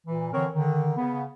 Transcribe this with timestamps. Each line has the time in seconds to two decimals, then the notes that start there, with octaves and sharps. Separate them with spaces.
0.06 A#2 E3
0.32 D3 E3 C4 A#4 C#5
0.52 D3 D#3
0.97 C#3 B3